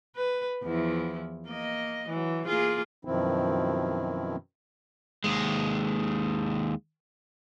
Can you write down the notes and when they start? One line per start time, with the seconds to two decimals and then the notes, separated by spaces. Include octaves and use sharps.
0.16 B4
0.64 E2 F3 E4
1.48 A#3 D#5
2.08 E3 F#3
2.46 A#3 F4 G#4
3.05 F#2 B2 D#3 F3 C4 E4
5.24 D#2 G#3